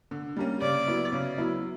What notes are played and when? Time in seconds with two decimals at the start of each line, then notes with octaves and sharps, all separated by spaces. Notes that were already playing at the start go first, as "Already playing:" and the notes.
0.11 D3
0.36 G3 A#3 C#4
0.61 C#3 D5
0.87 F#3 B3 E4
1.12 C#3
1.38 F#3 B3 E4